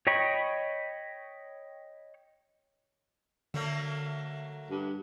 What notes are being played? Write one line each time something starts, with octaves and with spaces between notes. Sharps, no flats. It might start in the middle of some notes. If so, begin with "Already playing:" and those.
C#5 D#5 G5 B5 C#6
D3 F#3 A3 A#3
G2